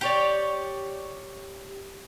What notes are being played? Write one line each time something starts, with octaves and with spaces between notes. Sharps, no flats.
G4 C#5 D5